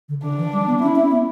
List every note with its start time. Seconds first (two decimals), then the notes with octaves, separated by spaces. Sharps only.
0.09 D3
0.23 D3 D4
0.38 E3
0.53 G3
0.67 B3
0.82 C#4 E4
0.96 C#4
1.11 B3